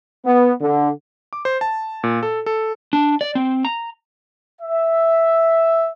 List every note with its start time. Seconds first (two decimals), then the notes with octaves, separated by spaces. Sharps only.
0.24 B3
0.59 D3
1.33 D6
1.45 C5
1.61 A5
2.04 A#2
2.23 A4
2.46 A4
2.93 D4
3.21 D5
3.35 C4
3.65 A#5
4.61 E5